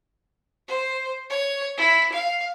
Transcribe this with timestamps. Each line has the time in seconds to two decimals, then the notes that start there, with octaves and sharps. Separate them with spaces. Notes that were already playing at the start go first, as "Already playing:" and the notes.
0.68 C5
1.30 C#5
1.77 E4
2.12 F5